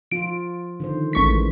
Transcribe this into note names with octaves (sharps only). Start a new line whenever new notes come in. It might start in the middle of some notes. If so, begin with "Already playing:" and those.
F3 F4 D7
D3 D#3 C5
A1 E3 G#3 C#6 B6